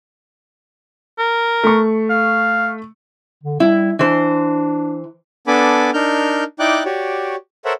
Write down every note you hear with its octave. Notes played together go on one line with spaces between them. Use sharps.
A#4
A3 C#6
F5
D3
G3 E4
E3 D4 C5
B3 D4 A4 G#5 B5 D6
D4 D#4 A#4 F6 G6
D#4 E4 D5 G5 D6 F#6
F#4 G4 C#5 D5
A4 A#4 C5 C#5 E5 F#5